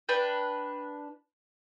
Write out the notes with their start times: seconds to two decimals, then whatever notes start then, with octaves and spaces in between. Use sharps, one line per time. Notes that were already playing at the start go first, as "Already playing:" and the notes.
0.09 D4 B4 G5